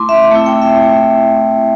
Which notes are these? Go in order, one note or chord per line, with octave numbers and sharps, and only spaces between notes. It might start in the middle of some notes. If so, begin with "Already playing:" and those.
Already playing: A3 E4 C6 D6
E5
A3 C4 E4
G5
E5